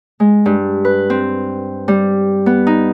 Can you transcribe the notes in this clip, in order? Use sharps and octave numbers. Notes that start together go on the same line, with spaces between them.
G#3
G2
B4
C4
G3
B3
D#4